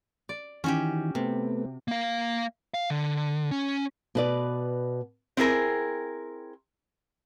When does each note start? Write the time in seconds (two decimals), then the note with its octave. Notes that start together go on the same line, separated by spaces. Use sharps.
0.29 D5
0.64 D#3 E3 C#4 F#4 G4
1.15 C3 A3 B3
1.88 A#3 F5
2.74 F5
2.90 D3
3.51 C#4
4.15 B2 B4 D5
5.37 C4 E4 G#4 A#4